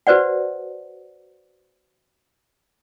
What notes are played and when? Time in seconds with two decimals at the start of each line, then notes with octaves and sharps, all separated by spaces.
0.07 F#4 B4 C5 D5 F#5